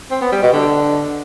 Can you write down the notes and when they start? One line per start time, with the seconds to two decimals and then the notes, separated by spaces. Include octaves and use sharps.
0.11 C4
0.21 B3
0.32 G3
0.42 B2
0.53 D3